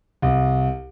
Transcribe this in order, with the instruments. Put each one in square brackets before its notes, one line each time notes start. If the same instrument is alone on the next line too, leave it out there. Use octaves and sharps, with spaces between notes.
[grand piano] C2